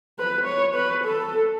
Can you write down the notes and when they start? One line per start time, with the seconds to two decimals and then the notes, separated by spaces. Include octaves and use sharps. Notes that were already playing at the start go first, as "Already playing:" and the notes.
0.19 B4
0.46 C#5
0.75 B4
1.04 A4